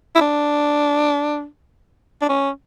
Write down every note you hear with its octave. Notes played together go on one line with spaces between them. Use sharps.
E4
D4
D4
C#4